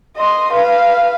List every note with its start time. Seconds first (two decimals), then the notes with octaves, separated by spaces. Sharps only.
0.17 D#5 C6
0.53 B4 F5